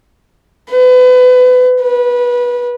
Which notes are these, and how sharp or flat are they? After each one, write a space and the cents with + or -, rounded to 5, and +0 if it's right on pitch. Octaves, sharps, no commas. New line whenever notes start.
B4 +30
B4 -20